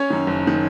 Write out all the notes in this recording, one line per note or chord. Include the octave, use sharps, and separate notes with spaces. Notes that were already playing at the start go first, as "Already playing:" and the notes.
Already playing: C#4 C#5
F#2 D#3
F#1
D#3